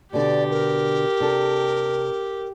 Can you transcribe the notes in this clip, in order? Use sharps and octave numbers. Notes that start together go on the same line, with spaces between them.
B2 D3 G4 D5
A#4
C3 D4 A4